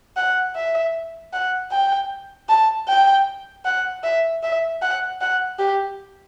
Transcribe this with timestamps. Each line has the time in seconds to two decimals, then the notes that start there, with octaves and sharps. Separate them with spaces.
0.16 F#5
0.55 E5
1.33 F#5
1.71 G5
2.49 A5
2.88 G5
3.65 F#5
4.04 E5
4.43 E5
4.82 F#5
5.21 F#5
5.59 G4